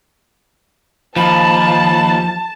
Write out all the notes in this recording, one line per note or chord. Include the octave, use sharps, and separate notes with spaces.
D#2 F3 A5 B5